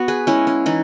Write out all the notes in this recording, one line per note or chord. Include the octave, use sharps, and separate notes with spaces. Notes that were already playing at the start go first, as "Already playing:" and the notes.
Already playing: B3 F#4
G#4 B4
G#3 C#4 E4
C#4
E3 D#4